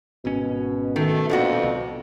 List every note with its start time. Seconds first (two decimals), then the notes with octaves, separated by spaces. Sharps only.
0.25 G#1 B2 C#4
0.96 D#3 A3
1.30 F2 A#2 D4 F#4
1.63 C2